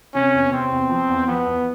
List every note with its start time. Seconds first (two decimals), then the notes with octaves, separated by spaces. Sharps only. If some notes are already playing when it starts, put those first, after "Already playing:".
0.15 C3 C#4
0.34 E2
0.52 C3 C4
0.71 E2
0.89 F3
1.09 E2
1.27 F3 B3
1.46 E2